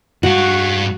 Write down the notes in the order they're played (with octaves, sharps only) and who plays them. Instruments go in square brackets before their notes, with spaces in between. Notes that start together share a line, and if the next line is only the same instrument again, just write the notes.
[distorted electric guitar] G2 F5 [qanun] F#4